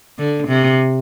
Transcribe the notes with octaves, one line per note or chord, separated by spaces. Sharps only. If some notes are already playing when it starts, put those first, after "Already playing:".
D3
C3